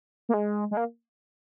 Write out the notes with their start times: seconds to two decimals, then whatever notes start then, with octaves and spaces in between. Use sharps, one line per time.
0.29 A#3
0.34 G#3
0.71 G#3
0.77 A#3